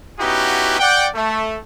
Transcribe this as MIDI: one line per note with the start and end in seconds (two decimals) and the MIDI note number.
0.20 0.79 59
0.20 0.79 61
0.20 0.79 63
0.20 0.79 64
0.20 0.79 66
0.20 0.79 67
0.80 1.07 74
0.80 1.07 78
0.80 1.07 79
1.15 1.56 57